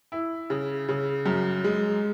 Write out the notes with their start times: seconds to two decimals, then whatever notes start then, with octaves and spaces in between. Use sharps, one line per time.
0.12 E4
0.50 C#3
0.88 C#3
1.26 F#2
1.64 G#3